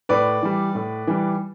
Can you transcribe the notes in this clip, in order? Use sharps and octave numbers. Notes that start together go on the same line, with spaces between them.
A2 B4 D5
E3 G3
A2
E3 G3